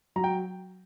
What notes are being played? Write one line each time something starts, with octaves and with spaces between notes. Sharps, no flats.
F#3 A#5
G5